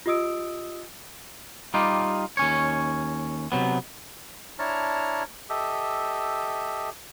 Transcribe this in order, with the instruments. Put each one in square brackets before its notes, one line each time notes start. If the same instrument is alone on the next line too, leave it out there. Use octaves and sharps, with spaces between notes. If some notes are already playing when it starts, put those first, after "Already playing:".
[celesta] F4 G4 D#5 D#6 E6 D7
[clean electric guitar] G3 D#4 F4 G4
D#2 C#4 C#5
C3 F#3 B3
[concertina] D4 E4 C#5 A5 A#5 F6
G4 A4 D#5 E5